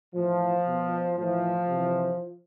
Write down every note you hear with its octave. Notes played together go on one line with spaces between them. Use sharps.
A2 E3 F3
B2
A2 E3 F3
C3 E3